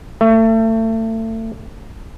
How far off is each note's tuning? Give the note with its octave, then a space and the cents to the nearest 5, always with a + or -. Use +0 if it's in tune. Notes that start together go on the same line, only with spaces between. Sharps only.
A3 +30